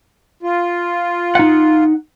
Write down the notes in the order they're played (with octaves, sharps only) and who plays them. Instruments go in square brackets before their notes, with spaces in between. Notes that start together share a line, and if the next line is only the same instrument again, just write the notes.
[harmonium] F4
[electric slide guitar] D#4 F#5